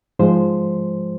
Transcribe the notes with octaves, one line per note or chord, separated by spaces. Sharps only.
G#2 F3 G#3 C5